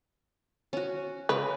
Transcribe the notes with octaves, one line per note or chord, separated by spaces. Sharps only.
C#4 F#4
C#3 G#3 B4